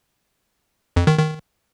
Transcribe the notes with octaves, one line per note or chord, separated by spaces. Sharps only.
F2
D#3
D#3